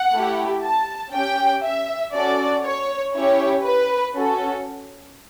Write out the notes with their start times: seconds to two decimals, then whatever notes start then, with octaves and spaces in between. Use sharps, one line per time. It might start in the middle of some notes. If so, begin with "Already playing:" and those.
Already playing: F#5
0.12 A3 E4 G4
0.63 A5
1.12 C#4 G4 G5
1.63 E5
2.13 C#4 F#4 A4 D5
2.64 C#5
3.14 C#4 E4 G4 C#5
3.64 B4
4.14 C#4 F#4 A4